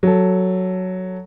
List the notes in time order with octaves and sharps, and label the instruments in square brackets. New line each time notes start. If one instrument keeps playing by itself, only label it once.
[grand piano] F#3 A4